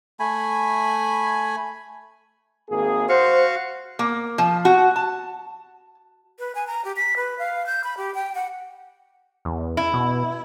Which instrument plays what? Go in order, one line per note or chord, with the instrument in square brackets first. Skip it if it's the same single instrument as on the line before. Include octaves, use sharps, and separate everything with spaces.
[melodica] A3 G#5 B5
[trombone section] G#1 A#3 G#4
[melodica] F#4 F5 C#6 [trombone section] C5
[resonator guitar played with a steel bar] A#3
F3
F#4
A5
[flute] B4
G#5
A#5
G4
B6
B4
F5
G6
B5
G4
G5
F#5
[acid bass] E2
[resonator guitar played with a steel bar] E4
[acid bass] B2